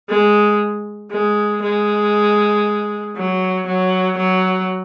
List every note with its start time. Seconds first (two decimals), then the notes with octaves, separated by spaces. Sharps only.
0.09 G#3
1.11 G#3
1.62 G#3
3.16 F#3
3.67 F#3
4.18 F#3